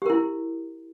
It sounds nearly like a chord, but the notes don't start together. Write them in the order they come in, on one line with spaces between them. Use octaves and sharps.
G4 A#4 E4